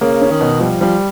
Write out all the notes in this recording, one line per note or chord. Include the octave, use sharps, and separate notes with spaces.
C#3 A#3
C#4
D#3
B2
F3 G3
F3 G3